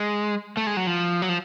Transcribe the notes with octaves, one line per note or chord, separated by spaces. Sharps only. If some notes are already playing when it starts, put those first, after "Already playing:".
Already playing: G#3
A3
G#3
F#3
F3
F#3
F3